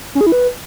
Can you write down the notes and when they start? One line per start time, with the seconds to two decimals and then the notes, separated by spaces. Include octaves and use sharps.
0.15 C#4
0.21 G#4
0.26 E4
0.32 B4